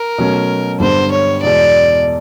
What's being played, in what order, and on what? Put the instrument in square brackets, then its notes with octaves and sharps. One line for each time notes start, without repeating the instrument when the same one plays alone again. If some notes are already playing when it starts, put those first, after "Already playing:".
Already playing: [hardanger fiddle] A#4
[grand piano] B2 F#3 A3 C#4
[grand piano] G2 D3 G3 B3 [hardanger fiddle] C5
[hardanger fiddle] C#5
[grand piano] E2 B2 G#3 [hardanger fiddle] D5